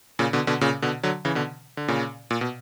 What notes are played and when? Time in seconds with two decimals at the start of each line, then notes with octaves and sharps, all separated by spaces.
0.19 A#2 C#3
0.33 B2 D3
0.47 B2 D3
0.61 A#2 C#3
0.82 B2 D3
1.03 D3 F#3
1.25 C#3 E3
1.35 B2 D3
1.77 D3
1.88 A#2 C#3
2.31 A#2
2.41 B2